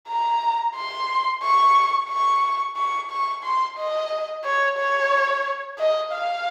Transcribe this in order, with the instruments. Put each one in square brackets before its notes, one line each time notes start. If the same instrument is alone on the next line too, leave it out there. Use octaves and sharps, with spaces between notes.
[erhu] A#5
C6
C#6
C#6
C#6
C#6
C6
D#5
C#5
C#5
D#5
F5